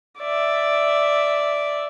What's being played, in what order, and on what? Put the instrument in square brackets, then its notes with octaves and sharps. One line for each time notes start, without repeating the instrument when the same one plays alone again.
[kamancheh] D5 E5